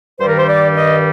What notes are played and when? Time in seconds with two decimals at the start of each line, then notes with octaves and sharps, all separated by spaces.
0.20 G2 D#3 G3 C5
0.28 A#4
0.37 C5
0.48 D5
0.77 D#5